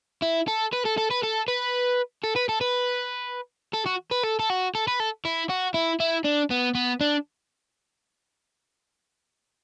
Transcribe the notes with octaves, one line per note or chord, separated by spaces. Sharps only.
E4
A4
B4
A4
A4
B4
A4
B4
A4
B4
A4
B4
A4
F#4
B4
A4
A4
F#4
A4
B4
A4
E4
F#4
E4
E4
D4
B3
B3
D4